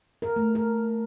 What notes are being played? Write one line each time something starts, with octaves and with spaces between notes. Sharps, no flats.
A#4
A3
A#4